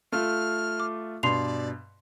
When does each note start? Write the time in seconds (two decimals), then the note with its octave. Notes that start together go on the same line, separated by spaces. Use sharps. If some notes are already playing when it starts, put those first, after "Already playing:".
0.12 A3 F4 F6
0.80 D6
1.23 G2 B2 D5 C6 C7 F7